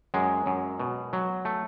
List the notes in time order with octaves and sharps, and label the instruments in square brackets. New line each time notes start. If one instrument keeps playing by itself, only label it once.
[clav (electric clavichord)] F#2 G#3
F#2
B2
F#3
A3